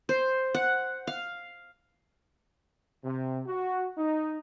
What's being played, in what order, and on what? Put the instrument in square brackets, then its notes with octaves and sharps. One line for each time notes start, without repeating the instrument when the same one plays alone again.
[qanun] C5
F#5
F5
[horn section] C3
F#4
D#4